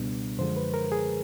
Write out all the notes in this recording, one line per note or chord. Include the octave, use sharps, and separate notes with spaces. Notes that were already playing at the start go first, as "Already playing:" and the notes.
Already playing: C#2 B2 G3 B3 D4
F#2 D3 F3 G#3 C5
B4
A#4
G#4